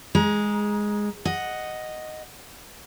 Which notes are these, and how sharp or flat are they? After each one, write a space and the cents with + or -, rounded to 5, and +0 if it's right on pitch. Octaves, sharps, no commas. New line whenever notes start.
G#3 +0 A#5 +30
D#5 +0 F#5 +0